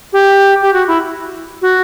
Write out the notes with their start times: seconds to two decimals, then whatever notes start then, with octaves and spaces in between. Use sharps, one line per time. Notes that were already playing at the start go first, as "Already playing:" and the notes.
0.13 G4
0.62 G4
0.73 F#4
0.88 E4
1.62 F#4